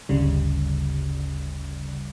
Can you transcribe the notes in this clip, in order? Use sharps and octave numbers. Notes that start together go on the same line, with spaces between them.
G1 D2 C#3 G3